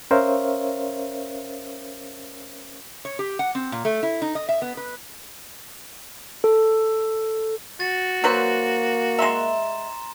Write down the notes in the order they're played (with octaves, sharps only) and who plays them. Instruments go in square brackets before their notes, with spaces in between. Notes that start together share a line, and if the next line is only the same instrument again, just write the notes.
[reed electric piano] C#4 A#4 C5 C#5 E5 F5
[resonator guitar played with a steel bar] C#5
G4
F#5
C4
A#2
A3
E4
D#4
D#5
E5
B3
B4
[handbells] A4
[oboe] F#4 [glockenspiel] A6
[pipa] F#3 B4 C5 [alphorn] A#3
[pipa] G#3 E5 [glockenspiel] A#5 C6 E7